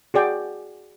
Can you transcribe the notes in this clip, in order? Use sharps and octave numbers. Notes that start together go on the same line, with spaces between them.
F#4 G#4 D5 G5